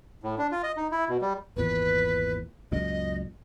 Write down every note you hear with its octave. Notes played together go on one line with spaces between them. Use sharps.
A2
D4
F4
D#5
D#4
E4
B2
G3
G#1 E2 A#2 B4
C#2 F#2 A#2 D#5